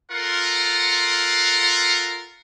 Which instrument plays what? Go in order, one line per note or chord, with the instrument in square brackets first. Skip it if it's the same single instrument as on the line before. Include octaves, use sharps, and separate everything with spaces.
[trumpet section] F4 A4 A#4 F#5 C6